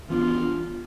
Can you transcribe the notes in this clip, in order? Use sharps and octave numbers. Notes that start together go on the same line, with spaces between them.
E3 B3 D4 F4